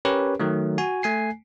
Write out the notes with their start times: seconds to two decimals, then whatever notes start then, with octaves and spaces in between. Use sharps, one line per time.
0.05 C#4 G4 A#4 B4 C#5
0.40 D#3 F#3 A3
0.78 F#4 G#5
1.03 A3 G#5 C7